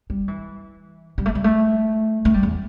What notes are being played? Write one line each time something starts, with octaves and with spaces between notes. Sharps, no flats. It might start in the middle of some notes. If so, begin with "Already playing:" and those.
G3
E3
G3
A3
G3
A3
A3
G3
E2